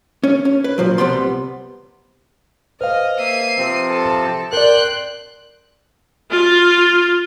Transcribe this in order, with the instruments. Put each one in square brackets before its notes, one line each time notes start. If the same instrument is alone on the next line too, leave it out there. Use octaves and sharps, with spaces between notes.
[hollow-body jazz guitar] C#4
C#4
B4
A#2 F3 F#3
C2 C3 G3 B3 C6
[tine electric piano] B4 C5 F5 [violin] D#5 [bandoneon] F6
[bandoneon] A#3 E5 [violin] C7 D#7
[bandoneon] C3 F3 C4
[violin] A4
[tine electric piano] A#4 D5 [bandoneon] G5 C6 G6 [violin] F#6
[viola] F4